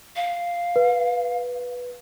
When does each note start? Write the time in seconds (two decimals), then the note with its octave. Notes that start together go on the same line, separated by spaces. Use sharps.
0.16 F5
0.76 B4